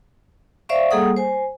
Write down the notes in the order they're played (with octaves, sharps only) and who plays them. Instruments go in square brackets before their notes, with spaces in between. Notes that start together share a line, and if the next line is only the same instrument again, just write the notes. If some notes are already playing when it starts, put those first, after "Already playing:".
[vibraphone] C5 D5 E5 F5 C#6
G3 A#3 G#4 A4 F#5 D#6
C5 G#5